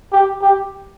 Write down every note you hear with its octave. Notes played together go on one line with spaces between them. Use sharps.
G4
G4